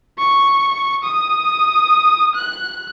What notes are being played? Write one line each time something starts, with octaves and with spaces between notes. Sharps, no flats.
C#6
D#6
F#6